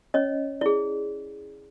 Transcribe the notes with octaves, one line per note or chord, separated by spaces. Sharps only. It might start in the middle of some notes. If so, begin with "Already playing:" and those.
C#4 C#5 D#5
E4 G#4 D5